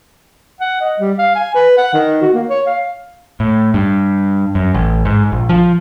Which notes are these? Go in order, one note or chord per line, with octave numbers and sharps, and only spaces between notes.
F#5
D#5
G3
F5
G#5
B4
F#5
D#3
F#4
A#3
C#5
F5
A2
G2
F#2
A1
G#2
A#1
F3